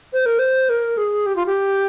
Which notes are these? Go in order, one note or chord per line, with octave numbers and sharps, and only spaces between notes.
C5
A#4
C5
A#4
G#4
G4
F4
G4